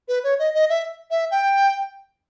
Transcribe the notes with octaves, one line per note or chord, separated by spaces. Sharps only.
B4
C#5
D#5
D#5
E5
E5
G5